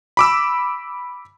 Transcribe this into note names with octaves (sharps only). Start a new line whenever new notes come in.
B5 D6 E6